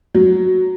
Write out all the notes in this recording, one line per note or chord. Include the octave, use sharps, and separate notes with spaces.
F#3